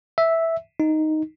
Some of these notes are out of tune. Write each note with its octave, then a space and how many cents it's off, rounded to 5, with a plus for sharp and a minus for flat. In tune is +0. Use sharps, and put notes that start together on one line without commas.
E5 -5
D#4 +0